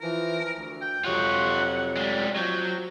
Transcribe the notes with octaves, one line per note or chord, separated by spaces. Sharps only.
E3 F3 A#4
D2
G5
F2 C3 F#3 F4 C#5 F#5
G3 G#3
F3 F#3 G5